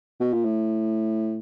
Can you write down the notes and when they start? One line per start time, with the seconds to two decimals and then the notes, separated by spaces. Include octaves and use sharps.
0.20 B2
0.33 A#2
0.45 A2